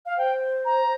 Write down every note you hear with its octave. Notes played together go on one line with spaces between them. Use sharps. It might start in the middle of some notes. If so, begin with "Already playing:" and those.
F5
C5 G5
A#5